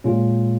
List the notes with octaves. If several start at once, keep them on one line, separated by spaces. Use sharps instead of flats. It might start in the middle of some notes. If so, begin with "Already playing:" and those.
A#2 G#3 C#4 F4